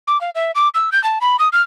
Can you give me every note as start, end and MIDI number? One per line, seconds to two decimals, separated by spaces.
0.07 0.20 86
0.21 0.30 77
0.35 0.51 76
0.55 0.69 86
0.74 0.90 88
0.92 1.02 91
1.04 1.19 81
1.21 1.36 83
1.39 1.49 87
1.53 1.62 89